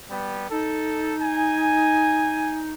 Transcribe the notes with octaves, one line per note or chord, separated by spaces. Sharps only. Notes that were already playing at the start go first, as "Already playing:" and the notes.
G3 B3
D#4 A4
G#5